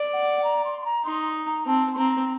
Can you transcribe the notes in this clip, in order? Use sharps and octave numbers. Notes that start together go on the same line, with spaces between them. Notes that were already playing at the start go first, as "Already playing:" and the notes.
Already playing: D5
F#5
A#5
C6
C6
A#5
D#4 C6
A#5
C4 A5
C6
C4 A#5